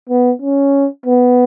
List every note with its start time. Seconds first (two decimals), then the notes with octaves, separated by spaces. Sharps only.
0.09 B3
0.42 C#4
1.06 B3